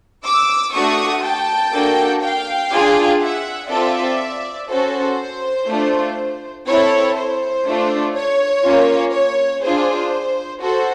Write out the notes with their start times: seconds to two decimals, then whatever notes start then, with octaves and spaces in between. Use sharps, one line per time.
0.25 D6 E6
0.74 A3 D4 F#4 C#6 D#6
1.23 G5 A5
1.73 A#3 D4 F#4 A4
2.22 F5 G5
2.71 D4 F4 G#4
3.22 E5 F#5
3.70 C4 F4 A4 D5 E5
4.69 C#4 F#4 A4 C5
5.68 A3 D4 F4
6.67 C4 E4 A4 C#5
7.16 C5
7.65 A3 D4 F4
8.14 C#5
8.64 A#3 C#4 F4
9.13 C#5
9.63 D4 F4 G#4 C5
10.62 F#4 A4 C5